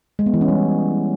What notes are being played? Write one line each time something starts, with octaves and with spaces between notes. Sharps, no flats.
G#3
B3
E3
C#4
G3